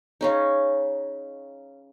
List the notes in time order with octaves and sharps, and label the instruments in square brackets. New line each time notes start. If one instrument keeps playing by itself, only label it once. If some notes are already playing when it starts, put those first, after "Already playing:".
[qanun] C#3 C#4 D#4